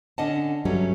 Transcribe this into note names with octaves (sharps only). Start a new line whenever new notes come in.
D3 C#4 D4 D#5 F#5 A5
G2 F#3 G3 A3 C#4